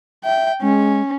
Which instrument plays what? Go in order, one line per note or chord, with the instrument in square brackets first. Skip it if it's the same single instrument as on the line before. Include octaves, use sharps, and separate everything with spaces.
[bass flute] E5 [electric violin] G5
[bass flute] G#3 [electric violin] C#4